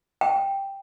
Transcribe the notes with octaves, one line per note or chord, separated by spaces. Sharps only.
G5